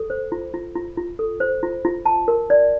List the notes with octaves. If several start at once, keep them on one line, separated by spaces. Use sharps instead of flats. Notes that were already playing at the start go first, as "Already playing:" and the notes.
Already playing: A4
C5
F4
F4
F4
F4
A4
C5
F4
F4
A5
A#4
D5